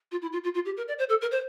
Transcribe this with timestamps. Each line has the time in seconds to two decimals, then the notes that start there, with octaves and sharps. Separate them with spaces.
0.12 F4
0.22 E4
0.32 F4
0.44 F4
0.54 F4
0.65 G4
0.77 A#4
0.88 D5
0.99 C5
1.09 A4
1.21 A#4
1.31 C5